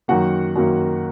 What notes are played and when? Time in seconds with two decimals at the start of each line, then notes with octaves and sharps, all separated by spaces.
0.08 F#2 D#3 F#3 A#3 F#4 F#5
0.56 F#2 D#3 F#3 A#3